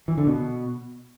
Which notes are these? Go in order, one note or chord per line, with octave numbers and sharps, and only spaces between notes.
E3
D3
B2